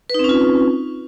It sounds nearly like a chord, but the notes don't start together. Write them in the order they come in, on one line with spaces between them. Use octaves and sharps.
B4 D#4 C4 C#4 F4